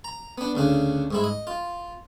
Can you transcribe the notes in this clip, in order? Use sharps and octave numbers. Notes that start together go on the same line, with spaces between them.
A#5
B3 D4
D2 C#3 D4
G#2 G#3 E4
D#5
F4